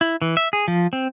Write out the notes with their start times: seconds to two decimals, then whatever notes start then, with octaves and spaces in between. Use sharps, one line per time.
0.01 E4
0.22 E3
0.37 E5
0.53 G#4
0.68 F3
0.93 C4